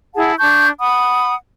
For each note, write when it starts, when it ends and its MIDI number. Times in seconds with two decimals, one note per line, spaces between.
0.15 0.32 64
0.15 0.32 68
0.15 0.32 78
0.15 0.32 81
0.39 0.67 62
0.39 0.67 81
0.39 0.67 85
0.39 0.67 91
0.79 1.34 78
0.79 1.34 83
0.79 1.34 87